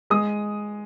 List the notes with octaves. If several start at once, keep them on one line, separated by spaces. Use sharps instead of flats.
G#3 D#6